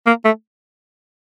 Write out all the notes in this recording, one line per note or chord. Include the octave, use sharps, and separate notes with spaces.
A#3
A3